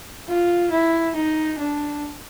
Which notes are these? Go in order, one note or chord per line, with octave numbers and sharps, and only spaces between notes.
F4
E4
D#4
D4